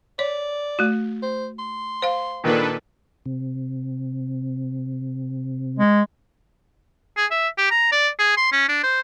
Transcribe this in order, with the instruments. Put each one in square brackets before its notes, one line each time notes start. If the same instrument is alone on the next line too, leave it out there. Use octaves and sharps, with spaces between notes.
[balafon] C#5 [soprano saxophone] D5
[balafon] A3 F#4
[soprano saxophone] C5
C6
[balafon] C5 F5
[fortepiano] A#2 D#3 A#3 [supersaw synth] D4 A4 B4
[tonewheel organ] C3
[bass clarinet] G#3
[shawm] G#4
E5
G4
A#5
D5
G#4
C6
C#4
D4
C5